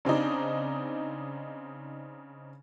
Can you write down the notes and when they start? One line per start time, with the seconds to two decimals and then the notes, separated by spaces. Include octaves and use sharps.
0.05 C#3 C4 D4 D#4